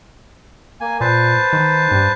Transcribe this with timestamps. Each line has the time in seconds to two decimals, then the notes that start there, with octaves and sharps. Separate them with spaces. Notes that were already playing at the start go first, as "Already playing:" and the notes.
0.81 A#3 G#5
1.01 A#2 B4 C5 A5
1.53 D#3
1.91 G2